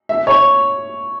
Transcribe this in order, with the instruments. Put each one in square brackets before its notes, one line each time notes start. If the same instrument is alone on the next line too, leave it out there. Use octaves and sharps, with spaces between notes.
[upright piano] E5
C#5